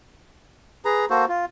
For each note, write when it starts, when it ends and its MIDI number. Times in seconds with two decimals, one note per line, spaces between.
0.85 1.05 68
0.85 1.05 71
0.85 1.05 82
1.10 1.25 58
1.10 1.25 66
1.10 1.25 69
1.10 1.25 72
1.28 1.45 65